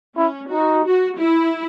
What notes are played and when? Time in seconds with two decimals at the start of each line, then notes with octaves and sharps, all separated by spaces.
0.17 C#4 E4
0.51 D#4 F#4
0.86 F#4
1.19 E4